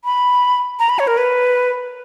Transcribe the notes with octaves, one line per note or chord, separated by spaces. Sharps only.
B5
A#5
B5
C#5
A#4
B4